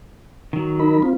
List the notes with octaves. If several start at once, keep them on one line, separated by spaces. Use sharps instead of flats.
D#3 F#3
D#4 A#4 B5
C4 F4